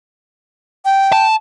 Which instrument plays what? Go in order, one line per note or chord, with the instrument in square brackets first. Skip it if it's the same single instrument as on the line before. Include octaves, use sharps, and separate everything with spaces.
[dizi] G5
[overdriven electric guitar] A5